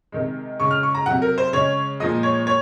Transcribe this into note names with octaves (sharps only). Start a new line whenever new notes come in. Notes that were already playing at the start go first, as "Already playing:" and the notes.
C3 D#3 G#3
C#3 G#3 C#6
F6
C#6
A#5
C3 F#3 F#5
A#4
C5
C#3 G#3 C#5
A#2 F3 G#3 D#5
C#5
C#5